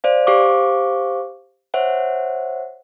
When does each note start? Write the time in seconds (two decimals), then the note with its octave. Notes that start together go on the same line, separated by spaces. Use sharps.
0.04 C5 D5 F5
0.27 G4 C5 F5 C#6 D6
1.74 C5 C#5 E5 F#5